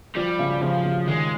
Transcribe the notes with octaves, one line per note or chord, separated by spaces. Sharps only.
F3 G3
C#3
C#3 F3
C#3
D#3 G#3